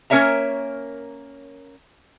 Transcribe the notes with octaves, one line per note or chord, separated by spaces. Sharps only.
A#3 C#4 A#4 C#5 E5 A#5